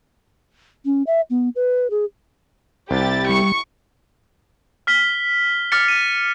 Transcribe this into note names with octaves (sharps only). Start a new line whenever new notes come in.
C#4
E5
B3
B4
G#4
C2 E4 G4 A6
G3 C#6
F6 B6 G7
D6 F6 A6 C#7
D#7